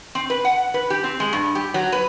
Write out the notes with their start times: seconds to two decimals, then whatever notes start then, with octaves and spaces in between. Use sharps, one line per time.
0.15 C4
0.30 B4
0.45 F#5
0.74 B4
0.90 G4
1.04 C4
1.20 G#3
1.33 G2
1.55 G4
1.74 F#3
1.92 B4